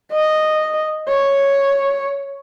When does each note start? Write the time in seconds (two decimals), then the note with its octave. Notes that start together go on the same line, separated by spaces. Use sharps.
0.11 D#5
1.08 C#5